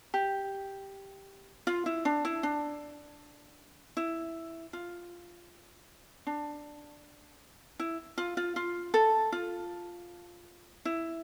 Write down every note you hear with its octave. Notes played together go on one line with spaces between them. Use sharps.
G4
F4
E4
D4
E4
D4
E4
F4
D4
E4
F4
F4
F4
A4
F4
E4